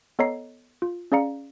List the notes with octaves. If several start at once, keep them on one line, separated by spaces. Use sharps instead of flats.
B3 A4 C#5 D#5 A#5 C7
F4
C#4 G#4 D5 F5 A#5 C#7